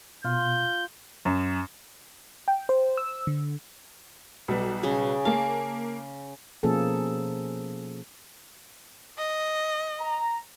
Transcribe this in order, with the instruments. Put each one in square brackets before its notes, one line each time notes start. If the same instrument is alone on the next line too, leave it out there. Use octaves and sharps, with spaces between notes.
[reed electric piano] B2 [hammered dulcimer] F4 [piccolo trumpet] G6
[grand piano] F#2
[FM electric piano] G5
C5
E6
D3
[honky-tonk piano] B1 G3 B3
[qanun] C#3 G#4
[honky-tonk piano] A#3 A5 [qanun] F5
[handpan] B2 F3 A#3 C#4 G#4 A4
[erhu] D#5
[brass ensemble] A#5